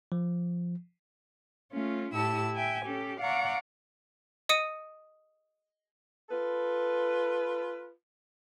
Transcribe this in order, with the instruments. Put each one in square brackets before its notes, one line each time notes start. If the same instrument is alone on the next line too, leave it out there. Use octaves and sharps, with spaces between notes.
[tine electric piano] F3
[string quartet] A3 C#4 F4
A2 E4 G4 A5 E6
E5 G5 G#5
C#4 G4 A4
D5 F5 F#5 A#5 C#6
[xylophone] D#5 D#6 C#7 D#7
[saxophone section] F4 A4 B4